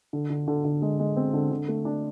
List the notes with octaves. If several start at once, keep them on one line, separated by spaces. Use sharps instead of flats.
D3
D3
D3
D3
G#3
G#3
C4
D3
D3
A3
D4